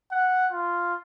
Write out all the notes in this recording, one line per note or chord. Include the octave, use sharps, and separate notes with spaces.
F#5
F4